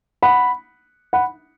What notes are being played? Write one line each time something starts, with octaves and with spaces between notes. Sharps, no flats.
F#5 B5
F#5 B5